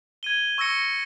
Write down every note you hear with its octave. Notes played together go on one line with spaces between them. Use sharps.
G#6 D#7 G7
C#6 E6 A#6 C#7